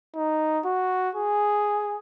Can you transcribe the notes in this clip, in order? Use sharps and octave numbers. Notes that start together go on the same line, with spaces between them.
D#4
F#4
G#4